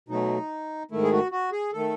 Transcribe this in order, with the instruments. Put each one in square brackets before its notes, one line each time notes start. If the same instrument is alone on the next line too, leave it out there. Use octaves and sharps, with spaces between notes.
[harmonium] B2 F#3 A3 D#4
G#2 D#3 A3 E4
G#4
F#4
F#4
G#4
D#3 A3 A4